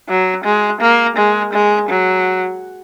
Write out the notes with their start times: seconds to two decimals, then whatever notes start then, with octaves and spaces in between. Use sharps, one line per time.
0.09 F#3
0.44 G#3
0.81 A#3
1.17 G#3
1.53 G#3
1.89 F#3